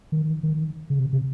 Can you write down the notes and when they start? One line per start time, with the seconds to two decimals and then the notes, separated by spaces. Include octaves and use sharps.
0.12 D#3
0.43 D#3
0.90 C#3
0.99 C3
1.13 C3